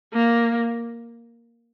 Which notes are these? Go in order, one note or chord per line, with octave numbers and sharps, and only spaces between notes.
A#3